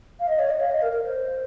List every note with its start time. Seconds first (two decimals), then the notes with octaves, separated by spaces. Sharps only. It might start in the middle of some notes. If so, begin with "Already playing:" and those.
0.20 F5
0.28 D#5
0.39 C#5
0.50 D#5
0.60 F5
0.71 D#5
0.82 A#4
0.92 A#4
1.03 C5